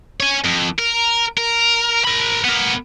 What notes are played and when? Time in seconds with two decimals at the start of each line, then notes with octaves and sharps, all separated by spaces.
0.20 C#5 G#5
0.44 F2
0.79 A#4
1.37 A#4
2.04 A#4 B5
2.44 B3 A#4